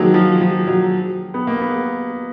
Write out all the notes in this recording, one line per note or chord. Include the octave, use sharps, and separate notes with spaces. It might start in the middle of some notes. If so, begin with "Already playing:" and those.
Already playing: D#3 F3 F#3 G#3 A#3
F3
F3
F#3
B3
A#3
B3